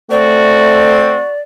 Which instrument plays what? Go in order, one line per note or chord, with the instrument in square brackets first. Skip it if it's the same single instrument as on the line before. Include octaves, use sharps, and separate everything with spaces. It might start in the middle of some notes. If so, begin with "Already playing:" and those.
[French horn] A3 [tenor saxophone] C4 [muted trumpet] F#4 [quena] D5